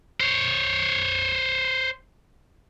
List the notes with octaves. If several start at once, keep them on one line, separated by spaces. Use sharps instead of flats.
C5 C#5